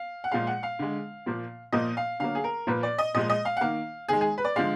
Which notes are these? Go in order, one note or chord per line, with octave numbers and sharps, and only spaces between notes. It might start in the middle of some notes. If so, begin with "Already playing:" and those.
Already playing: F5
F#5
A#2 F3 G#3 F5
F#5
F5
D3 G#3
A#2 F3 A#3
A#2 F3 A#3 D#5
F5
D3 F#3 A#3 F5
G#4
A#4
A#2 F3 A#3 B4
D5
D#5
A#2 F3 G#3 D#5
D#5
F5
F#5
D#3 A#3 F5
D#3 G#3 G#4
G#4
B4
D5
D3 F3 G#3 F5